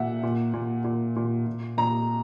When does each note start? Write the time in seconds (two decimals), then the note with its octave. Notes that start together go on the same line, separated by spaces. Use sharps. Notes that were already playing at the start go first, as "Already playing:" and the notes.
Already playing: A#2 E5 F#5
0.23 A#2
0.54 A#2
0.84 A#2
1.16 A#2
1.46 A#2
1.77 A#2 A#5